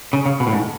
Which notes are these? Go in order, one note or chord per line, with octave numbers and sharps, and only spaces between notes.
C#3
C#3
B2
A2
G#2